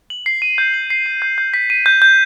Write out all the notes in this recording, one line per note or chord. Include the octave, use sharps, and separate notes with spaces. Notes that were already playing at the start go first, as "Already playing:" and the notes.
F#7
C7
D#7
G6
F#7
C7
D#7
G6
G6
B6
D#7
G6
G6